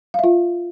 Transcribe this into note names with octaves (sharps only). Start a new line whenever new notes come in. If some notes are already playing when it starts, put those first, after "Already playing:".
F4 E5 F5